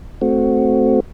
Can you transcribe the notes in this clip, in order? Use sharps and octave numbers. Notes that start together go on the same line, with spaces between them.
A3 C4 F#4